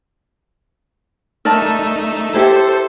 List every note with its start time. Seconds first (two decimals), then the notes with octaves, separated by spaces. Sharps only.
1.45 A3 D#4 A#4 D5 A5 E6
2.34 E4 G4 A4 C5 E5